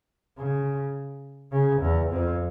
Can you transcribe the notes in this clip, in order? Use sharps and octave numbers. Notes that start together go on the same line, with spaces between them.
C#3
C#3
E2
F2